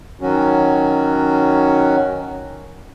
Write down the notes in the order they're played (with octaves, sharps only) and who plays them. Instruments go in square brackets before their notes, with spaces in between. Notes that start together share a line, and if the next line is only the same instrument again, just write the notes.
[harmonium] D#3 F#3 C#4 F#4